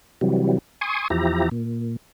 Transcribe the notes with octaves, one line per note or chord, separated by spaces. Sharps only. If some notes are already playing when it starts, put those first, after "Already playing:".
C3 E3 F#3 G3
G#5 C6 C#6 D#6
E2 F3 E4 G4 A#5
A#2